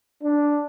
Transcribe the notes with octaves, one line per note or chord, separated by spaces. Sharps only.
D4